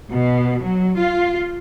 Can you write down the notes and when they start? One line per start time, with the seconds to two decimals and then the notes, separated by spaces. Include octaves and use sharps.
0.12 B2
0.63 F#3
0.97 F4